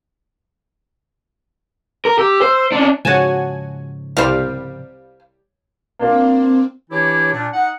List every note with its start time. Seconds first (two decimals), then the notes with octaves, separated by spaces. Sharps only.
2.05 A#4
2.18 G4 E6
2.42 C5
2.72 C#4 D4
3.05 G#2 C#3 F3 F#4 C#5 G#5 A5
4.17 C2 G3 C5 F5
5.99 A#3 C4 D4 F4
6.90 E3 D4 E4 G4 C#5
7.33 A#2 D4
7.53 D#4 F#5